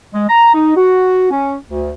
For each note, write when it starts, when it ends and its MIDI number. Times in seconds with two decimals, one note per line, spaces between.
0.13 0.25 56
0.28 0.53 82
0.54 0.74 63
0.76 1.28 66
1.31 1.55 61
1.69 1.91 38